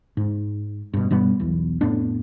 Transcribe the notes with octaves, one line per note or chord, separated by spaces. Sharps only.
G#2
G2 B2
G2 B2 G3 B3
B1 E2
F2 A2 B3 D4